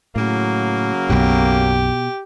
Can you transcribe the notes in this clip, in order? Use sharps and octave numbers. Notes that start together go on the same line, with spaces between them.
A2 C#3 F#3 A#3
B1 F#2 B2 G4